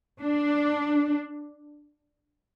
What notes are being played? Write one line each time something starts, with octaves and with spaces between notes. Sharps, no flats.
D4